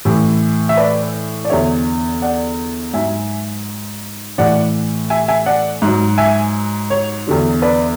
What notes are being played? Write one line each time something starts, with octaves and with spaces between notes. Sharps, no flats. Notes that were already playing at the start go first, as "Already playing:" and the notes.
A2 E3
E5
B4 D5
D5
E2 D3 F#3 C#5 E5
D5 F#5
G#2 F#3 E5 G#5
A2 E3 D5 F#5
E5 G#5
E5 G#5
D5 F#5
G#2
F#3
E5 G#5
C#5
E2 D3 F#3
B4 D5